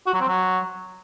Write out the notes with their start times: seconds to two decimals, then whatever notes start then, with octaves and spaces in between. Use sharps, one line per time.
0.07 F#4
0.14 F#3
0.21 C4
0.28 F#3